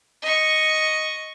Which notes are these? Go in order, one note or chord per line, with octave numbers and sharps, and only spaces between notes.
D#5 C#6